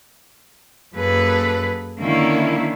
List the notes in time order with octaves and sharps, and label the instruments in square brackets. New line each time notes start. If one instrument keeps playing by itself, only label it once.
[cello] F#2 B4 [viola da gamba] A#3 G#4 A4
[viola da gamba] D3 D#3 C#4 [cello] A#3 E4